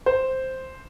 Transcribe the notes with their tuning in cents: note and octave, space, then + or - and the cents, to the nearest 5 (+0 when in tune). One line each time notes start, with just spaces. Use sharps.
C5 +0